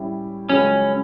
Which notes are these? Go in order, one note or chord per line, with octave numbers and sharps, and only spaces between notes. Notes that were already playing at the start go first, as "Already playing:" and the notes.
Already playing: A2 G3 C#4 E4 G4
C#2 C#3 F#3 C#4